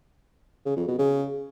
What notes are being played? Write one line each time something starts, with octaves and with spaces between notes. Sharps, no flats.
C#3
F2
B2
C#3